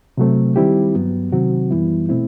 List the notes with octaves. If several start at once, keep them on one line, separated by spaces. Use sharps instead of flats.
C3 F#3 A3 C4
D#3 G3 C4 E4 G4
G2 F#3 B3
C3 D#3 F#3 C4 F#4
F#2 E3 G3 B3 E4
B2 A3 C4 E4